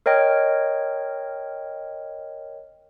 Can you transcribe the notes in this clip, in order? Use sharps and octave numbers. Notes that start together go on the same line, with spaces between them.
A#4 C#5 D#5 G5 F6